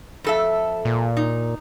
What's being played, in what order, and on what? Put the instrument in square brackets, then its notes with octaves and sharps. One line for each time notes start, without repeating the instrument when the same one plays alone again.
[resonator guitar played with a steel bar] F2 A4 E5
[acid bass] A#2
[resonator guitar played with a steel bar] D#4